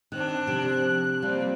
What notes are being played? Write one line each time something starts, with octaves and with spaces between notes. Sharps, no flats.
D#3 C4 D4 F#6
C3 F3
F3 G3 A#3 C4